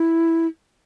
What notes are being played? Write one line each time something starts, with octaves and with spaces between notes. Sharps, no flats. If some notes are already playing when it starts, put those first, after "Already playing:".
Already playing: E4